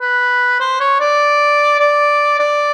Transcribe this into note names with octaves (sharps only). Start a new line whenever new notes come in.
B4
C5
C#5
D5
D5
D5